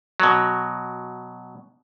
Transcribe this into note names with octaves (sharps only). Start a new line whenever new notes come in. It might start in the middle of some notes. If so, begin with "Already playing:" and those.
B2 F#3